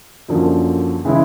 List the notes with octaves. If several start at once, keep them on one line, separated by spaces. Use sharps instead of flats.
F#2 D3 F3 A#3
C#3 E3 G#3 C#4 E4